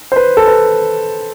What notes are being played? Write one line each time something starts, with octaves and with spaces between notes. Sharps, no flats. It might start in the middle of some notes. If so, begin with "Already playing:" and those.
C5
B4
A4
B4